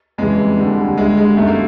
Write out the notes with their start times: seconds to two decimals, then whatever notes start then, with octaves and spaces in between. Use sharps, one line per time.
0.18 F2 C#3 E3 G3 G#3
0.58 D#2 D3 G3
0.98 D2 D3 G3 G#3
1.18 G#3
1.37 F#2 D#3 G3 A3
1.47 A#3